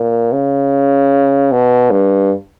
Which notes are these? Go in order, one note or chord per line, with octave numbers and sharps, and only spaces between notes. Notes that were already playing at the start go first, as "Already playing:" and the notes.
Already playing: A#2
C#3
B2
G2